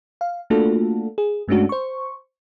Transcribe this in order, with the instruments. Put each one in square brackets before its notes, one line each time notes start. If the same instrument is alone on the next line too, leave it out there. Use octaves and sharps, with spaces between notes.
[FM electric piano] F5
A3 A#3 D4 F4 F#4 A4
G#4
G2 G#3 A3 C#4 D4 F#4
C5 C#6